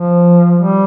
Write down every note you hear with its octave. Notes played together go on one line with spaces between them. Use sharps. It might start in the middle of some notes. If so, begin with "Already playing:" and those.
Already playing: F3
G3